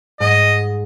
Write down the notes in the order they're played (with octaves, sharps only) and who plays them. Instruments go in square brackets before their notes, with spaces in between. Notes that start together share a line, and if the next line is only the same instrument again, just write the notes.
[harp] G#2 [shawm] D#5